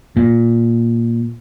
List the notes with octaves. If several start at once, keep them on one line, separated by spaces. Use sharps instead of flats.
A#2